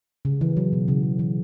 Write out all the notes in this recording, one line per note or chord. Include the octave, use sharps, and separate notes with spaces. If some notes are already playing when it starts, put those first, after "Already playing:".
C#3
E3
F#3
B2
C#3
C#3
E3